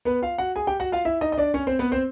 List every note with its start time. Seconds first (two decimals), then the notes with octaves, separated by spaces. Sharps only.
0.05 B3 B4
0.22 F4 F5
0.38 F#4 F#5
0.56 G#4 G#5
0.67 G4 G5
0.80 F#4 F#5
0.92 F4 F5
1.05 E4 E5
1.21 D#4 D#5
1.32 D#5
1.38 D4 D5
1.54 C#4 C#5
1.67 C4 C5
1.79 B3 B4
1.92 C4 C5